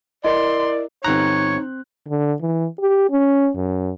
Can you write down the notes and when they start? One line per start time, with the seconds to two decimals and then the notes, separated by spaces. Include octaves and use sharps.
0.24 E4 A#4 D5 D#5 C6
1.04 G1 C4 D#4 C#5 A#5 F#6
2.08 D3
2.41 E3
2.80 G4
3.11 C#4
3.56 F#2